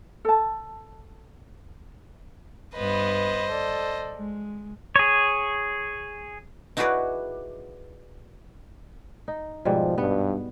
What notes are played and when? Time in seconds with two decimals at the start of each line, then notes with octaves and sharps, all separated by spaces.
0.25 A4 A5
2.76 G2 B3 B4 C5 D#5
3.50 A4 D5
4.16 G#3
4.96 G#4 C#5
6.77 D#4 E4 F#4 G#4 B4 D5
9.28 D#4
9.65 G#2 B2 F3 G3
9.98 G2 B3